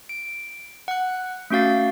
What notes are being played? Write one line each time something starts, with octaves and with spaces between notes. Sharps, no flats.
D7
F#5 F#6
A3 C#4 F#4 F5 A6